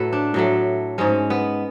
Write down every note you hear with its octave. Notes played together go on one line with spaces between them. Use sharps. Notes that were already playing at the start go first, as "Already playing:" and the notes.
Already playing: A2 F#3 A3 A4 B4
D4
A2 F#3 A3
G#2 G#3 C#4
B3